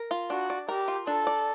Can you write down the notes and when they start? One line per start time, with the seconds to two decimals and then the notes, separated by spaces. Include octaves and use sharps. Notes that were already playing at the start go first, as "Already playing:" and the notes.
Already playing: A#4
0.11 F4
0.30 D4 F#4
0.50 D5
0.68 G4 A#4
0.88 F4
1.07 D4 A4
1.27 D5